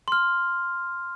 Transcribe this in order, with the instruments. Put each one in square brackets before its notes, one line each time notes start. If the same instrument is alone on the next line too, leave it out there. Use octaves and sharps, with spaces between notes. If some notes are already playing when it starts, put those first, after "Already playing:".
[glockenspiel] C6 F6